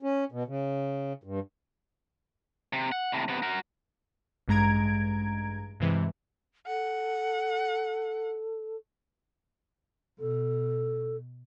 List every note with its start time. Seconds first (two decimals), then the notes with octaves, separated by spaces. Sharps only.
0.03 C#4
0.32 B2
0.47 C#3
1.23 G2
2.73 C3
2.92 F#5
3.12 A2 C3
3.28 C3 B3
3.42 F#4 A#4
4.48 A1 G2 G#3 A#5 G#6 D7
5.80 G2 C3 E3 G#3
6.67 A4 F#5
10.20 B2 A4